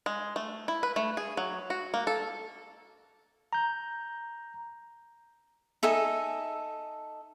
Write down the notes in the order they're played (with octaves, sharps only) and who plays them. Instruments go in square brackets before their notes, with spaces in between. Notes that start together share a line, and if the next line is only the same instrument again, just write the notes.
[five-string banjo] G#3
A3
E4
B4
A3
G#4
F#3
F#4
A#3
A4
[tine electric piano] A#5 G6
[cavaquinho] D#4 A4 E5 G#5